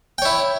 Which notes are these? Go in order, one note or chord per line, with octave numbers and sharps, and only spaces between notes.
E4 C#5 G5